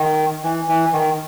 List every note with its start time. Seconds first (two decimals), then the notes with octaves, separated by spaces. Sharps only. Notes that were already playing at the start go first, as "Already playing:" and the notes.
Already playing: D#3
0.44 E3
0.68 E3
0.93 D#3